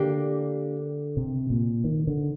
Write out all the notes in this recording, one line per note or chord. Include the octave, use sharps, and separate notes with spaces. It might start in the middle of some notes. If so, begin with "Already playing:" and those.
Already playing: D3 A#3 D4 G4
C3
A#2
D#3
D3